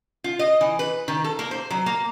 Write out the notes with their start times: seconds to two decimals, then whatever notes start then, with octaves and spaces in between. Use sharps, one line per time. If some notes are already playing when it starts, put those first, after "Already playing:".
0.24 F4
0.39 D#5
0.61 E3
0.79 B4
1.08 D#3
1.24 A4
1.39 A#3
1.51 C5
1.70 F#3
1.86 A#3